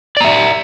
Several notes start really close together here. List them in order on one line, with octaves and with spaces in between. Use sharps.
D5 A#5 E5